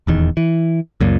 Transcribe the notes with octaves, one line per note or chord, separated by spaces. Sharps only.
D#1 E2 D#3
E3
C#2 F#2 A#2